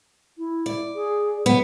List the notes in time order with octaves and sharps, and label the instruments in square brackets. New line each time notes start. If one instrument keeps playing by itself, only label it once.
[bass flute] E4
[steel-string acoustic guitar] D5
[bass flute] G#4
[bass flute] F#3 [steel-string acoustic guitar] B3